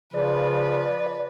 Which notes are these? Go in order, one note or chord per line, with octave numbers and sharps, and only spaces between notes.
C#3 F3 B4 D5